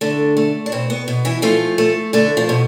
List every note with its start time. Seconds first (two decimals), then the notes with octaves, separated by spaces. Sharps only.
0.01 D3 A3 D4
0.37 A3
0.66 D4
0.72 B2 C4
0.90 B3
1.08 B2
1.25 E3 E4
1.42 F3 A3 F4
1.78 A3
2.13 D3 A3 D4
2.37 F3 F4
2.49 B2